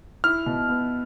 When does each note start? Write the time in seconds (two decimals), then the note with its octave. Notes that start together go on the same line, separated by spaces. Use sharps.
0.24 E4 F6
0.46 B2
0.69 B3